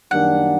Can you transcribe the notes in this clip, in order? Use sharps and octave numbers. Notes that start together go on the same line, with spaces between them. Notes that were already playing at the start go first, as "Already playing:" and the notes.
F#2 D#3 G3 A#3 D4 F#5